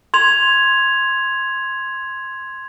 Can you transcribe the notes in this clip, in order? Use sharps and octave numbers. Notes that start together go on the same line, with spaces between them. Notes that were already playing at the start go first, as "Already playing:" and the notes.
C6 G#6 F7